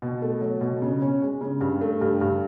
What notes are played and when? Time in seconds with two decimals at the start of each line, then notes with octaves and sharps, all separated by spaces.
0.02 B2
0.22 A3
0.41 F#3
0.61 B2
0.82 C#3
1.02 C#4
1.22 G#3
1.41 C#3
1.61 G2
1.81 A3
2.01 G2
2.21 G2